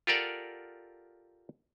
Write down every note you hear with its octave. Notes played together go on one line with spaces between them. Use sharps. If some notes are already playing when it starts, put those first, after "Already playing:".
F4 G4 A4 A#4 D5 F#5